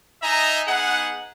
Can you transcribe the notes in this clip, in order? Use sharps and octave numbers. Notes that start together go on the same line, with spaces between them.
D#4 D#5 E5 G#5 A#5
B3 D#4 G#4 F#5